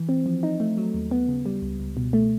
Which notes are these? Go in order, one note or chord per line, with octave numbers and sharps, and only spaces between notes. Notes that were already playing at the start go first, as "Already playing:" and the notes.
Already playing: E3
C4
F3
D#4
A3
F#3
D#2
B3
C#3
G3
C#2
C#2
B2
A3